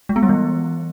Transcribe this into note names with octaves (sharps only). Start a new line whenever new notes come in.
G#3
B3
G3
E3